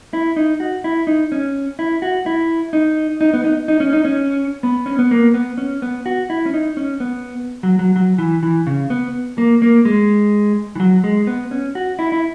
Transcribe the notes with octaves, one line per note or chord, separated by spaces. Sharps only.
E4
D#4
F#4
E4
D#4
C#4
E4
F#4
E4
D#4
D#4
B3
D#4
D#4
C#4
D#4
C#4
B3
C#4
B3
A#3
B3
C#4
B3
F#4
E4
C#4
D#4
C#4
B3
F#3
F#3
F#3
E3
E3
C#3
B3
A#3
A#3
G#3
E3
F#3
G#3
B3
C#4
F#4
E4
E4